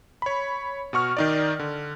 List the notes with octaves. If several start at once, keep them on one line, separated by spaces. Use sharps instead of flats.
C#5 B5
B2 F#4 C#6 F6
D#3 D#4 D5
D3